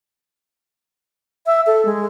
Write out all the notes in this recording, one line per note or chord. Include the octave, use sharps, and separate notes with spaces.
E5
A4
G#3